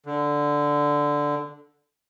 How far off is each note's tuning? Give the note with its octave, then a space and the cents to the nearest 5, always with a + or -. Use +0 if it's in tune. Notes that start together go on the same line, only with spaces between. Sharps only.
D3 -5